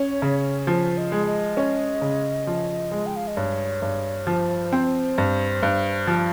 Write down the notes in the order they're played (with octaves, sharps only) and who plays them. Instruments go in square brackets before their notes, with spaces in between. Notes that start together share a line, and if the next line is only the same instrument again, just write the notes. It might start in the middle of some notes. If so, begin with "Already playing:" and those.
Already playing: [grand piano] C#4 [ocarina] C#5
[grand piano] C#3
[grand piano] F3 [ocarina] C5
[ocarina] D#5
[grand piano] G#3
[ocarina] D#5
[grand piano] C#4
C#3
F3
G#3
[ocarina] G5
F5
D#5
[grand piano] G2 [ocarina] C#5
[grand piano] G2
[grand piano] F3 [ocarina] C5
[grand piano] C4
G2
G2
F3